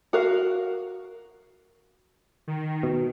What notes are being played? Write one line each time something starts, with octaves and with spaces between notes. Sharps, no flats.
F#4 A#4 F5
D#3
B2